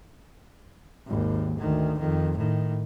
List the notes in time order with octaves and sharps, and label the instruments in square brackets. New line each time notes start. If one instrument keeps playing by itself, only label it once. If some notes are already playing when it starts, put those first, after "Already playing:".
[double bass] G#1 D#2
D2 D#3
F2 D#3
A2 D#3